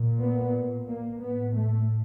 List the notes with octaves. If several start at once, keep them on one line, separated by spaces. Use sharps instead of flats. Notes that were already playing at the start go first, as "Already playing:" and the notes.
Already playing: A#2
B3
A#3
A2 B3
A3